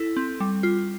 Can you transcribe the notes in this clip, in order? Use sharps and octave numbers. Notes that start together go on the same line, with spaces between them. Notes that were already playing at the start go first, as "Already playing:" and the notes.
Already playing: E4 A4
C4
G3
F4